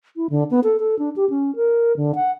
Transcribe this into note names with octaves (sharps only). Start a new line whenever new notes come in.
E4
D3
B3
A4
A4
D4
G4
C#4
A#4
D3
F#5